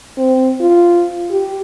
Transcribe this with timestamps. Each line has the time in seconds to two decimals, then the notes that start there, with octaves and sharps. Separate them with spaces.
0.18 C4
0.61 F4
1.31 G4